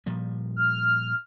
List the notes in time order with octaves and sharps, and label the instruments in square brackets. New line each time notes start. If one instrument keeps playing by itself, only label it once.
[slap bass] A#2 F3 G3
[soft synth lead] F6